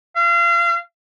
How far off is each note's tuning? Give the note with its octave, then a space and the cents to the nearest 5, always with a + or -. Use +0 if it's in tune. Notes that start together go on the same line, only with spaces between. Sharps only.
F5 -30